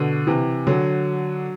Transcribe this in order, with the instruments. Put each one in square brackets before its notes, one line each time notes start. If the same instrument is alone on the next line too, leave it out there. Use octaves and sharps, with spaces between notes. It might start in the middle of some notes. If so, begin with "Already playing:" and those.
Already playing: [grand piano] B2 D3
C3 E3
D3 F#3